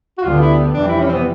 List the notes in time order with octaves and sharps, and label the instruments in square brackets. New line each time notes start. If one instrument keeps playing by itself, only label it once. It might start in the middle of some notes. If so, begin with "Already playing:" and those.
[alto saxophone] F#4
[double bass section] D2 D3 G3 B3 [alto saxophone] F4
[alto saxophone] E4
[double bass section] F2 C3 E3 G3 [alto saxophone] D4
[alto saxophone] E4
C#4
C4
B3